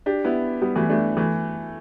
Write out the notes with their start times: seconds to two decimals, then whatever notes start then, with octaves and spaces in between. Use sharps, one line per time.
0.06 D4 G4
0.24 B3 E4
0.61 G3 B3
0.75 E3 A3
0.89 A3 D4
1.17 E3 A3